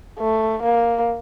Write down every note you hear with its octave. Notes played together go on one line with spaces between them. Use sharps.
A3
A#3